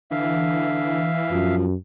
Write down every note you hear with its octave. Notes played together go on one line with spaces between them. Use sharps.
D3 E3 E5 F5
F#2 F3